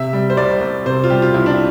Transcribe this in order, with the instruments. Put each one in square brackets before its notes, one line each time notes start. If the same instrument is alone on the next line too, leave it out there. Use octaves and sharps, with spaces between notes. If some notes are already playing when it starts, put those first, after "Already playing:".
Already playing: [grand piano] C3 E5
G3
C5
C2 D5
C2
C3 C5
F4
G3 G4
F4
C2 E4
D4
E4